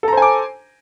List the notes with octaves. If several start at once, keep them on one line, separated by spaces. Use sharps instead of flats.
A4 C5 G#5 A#5 D6